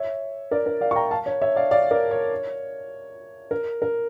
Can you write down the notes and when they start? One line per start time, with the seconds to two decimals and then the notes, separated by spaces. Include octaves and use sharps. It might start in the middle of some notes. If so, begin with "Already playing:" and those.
Already playing: C#5 E5
0.51 A#4 D5
0.66 A#4
0.81 D5 F5
0.91 C#6
0.96 G5 A#5
1.11 F5 A5
1.26 C#5
1.41 C#5 E5
1.56 D5 F5
1.71 D5 F5
1.91 A#4 D5
2.11 C#5
3.51 A#4
3.82 A#4